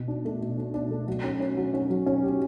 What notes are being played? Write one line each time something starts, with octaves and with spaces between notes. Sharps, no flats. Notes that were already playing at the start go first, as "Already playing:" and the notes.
Already playing: B2
D4
A3
B2
D4
D4
A3
F#3
C#4
C#4
F#3
C#4
F#3
C#4
G4